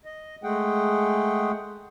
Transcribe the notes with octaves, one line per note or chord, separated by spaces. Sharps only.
D#5
G#3 A3 G#4 F#5 G5